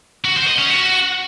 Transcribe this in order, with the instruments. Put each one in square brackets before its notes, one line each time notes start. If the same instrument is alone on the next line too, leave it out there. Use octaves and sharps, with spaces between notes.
[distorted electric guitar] F#4
C5
D#5
C#4
F#4